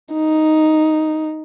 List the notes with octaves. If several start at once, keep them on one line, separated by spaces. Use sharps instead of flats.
D#4